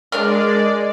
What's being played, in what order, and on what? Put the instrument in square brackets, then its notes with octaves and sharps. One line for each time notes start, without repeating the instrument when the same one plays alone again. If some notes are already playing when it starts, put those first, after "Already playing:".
[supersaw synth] G#3 D5 [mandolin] D4 A#4 F6